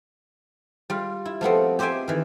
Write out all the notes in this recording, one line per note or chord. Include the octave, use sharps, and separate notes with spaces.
G3 F4
E4
F3 A3 B3 C4
G4 C5 D#5 E5 G5 G#5
D#3 E3